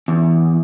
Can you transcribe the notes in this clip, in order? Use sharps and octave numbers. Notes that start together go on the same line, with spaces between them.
E2